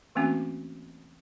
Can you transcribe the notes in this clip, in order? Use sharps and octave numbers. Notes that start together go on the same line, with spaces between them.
E3 A3 A#3 C4 C#4 F#4